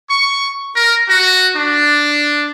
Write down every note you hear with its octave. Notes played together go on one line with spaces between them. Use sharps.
C#6
A#4
F#4
D4